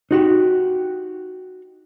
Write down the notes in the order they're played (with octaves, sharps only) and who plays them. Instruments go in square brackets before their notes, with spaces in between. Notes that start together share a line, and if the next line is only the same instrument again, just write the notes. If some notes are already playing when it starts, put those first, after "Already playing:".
[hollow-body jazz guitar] D#4 F#4 G4